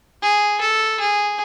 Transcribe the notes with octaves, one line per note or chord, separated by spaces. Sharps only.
G#4
A4
G#4